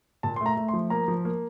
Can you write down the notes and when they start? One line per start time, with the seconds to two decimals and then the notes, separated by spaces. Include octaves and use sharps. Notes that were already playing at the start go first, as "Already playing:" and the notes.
0.23 A#2 A5
0.36 A3 C6
0.46 A#5
0.57 A3
0.68 C6
0.73 F3
0.90 A#3 A#5
1.08 F3
1.25 A#3